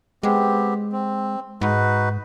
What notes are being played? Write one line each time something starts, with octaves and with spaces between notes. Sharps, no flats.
G#3 B3 C4 G4
C4
G#2 D#4 F#4 B4